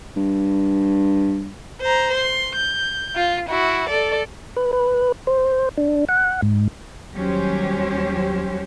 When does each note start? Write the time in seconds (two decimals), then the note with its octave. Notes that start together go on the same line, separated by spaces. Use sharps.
0.16 G2
1.82 C5 A#5
2.14 C6
2.56 G6
3.15 F4
3.49 E4 F#4
3.89 A4 D5
4.56 B4
4.73 B4
5.27 C5
5.78 D4
6.09 F#5
6.42 G#2
7.14 D#2 F#3 G3 C#4 G4 C5